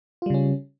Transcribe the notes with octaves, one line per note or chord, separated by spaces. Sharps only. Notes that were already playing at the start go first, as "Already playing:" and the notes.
C#3 G3 C#4 F4